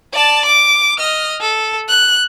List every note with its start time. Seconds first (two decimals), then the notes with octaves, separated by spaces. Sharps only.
0.14 D5 A5
0.45 D6
0.99 D#5 F6
1.41 A4
1.88 F#6